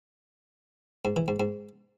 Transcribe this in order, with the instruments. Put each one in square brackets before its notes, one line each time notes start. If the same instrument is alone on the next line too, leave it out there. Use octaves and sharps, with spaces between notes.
[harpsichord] G#2
E3
G#2
G#2